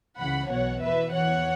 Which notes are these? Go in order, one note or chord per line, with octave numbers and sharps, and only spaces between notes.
C#2 C#3 E3 F#5 B5
B1 B2 C#5 F#5
E2 E3 B4 E5
E2 E3 C#5 F#5